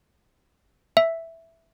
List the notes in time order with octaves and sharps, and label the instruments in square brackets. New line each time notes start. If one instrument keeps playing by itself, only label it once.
[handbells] E5